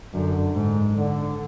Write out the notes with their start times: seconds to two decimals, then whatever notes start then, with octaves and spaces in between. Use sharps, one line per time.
0.14 F#2 D3
0.55 G#2
0.96 D3